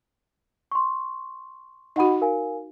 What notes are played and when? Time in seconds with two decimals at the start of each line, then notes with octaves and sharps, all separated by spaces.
0.71 C6 C#6
1.96 D#4 F#4 D#5 F#5 B5
2.21 A#4 F5 G#5